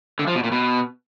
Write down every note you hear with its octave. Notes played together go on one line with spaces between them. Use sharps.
D3
F3
B2
A#2
B2